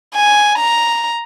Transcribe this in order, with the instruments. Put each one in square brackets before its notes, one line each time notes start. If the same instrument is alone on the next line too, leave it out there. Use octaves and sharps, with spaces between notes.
[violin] G#5
A#5